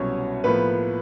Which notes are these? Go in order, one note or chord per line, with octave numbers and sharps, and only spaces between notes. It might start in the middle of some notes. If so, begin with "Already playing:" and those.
Already playing: C2 B2 F#3 C#4 C#5
A2 F3 A#3 B3 B4